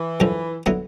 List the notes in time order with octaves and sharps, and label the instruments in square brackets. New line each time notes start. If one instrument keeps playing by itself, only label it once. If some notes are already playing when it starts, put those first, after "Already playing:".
Already playing: [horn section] E3
[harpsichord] F#2 D3 F3
D3 F#3 B3 E4